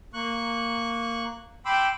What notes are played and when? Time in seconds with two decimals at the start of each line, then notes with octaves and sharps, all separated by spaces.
0.14 A#3 C#6 F#6
1.65 G5 B5 C6 D6 E6